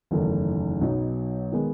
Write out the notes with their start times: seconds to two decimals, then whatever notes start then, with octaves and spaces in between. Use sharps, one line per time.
0.11 F#1 E2 D#3 A3
0.81 B1 B2 F#3 B3 D#4
1.52 D#3 G#3 B3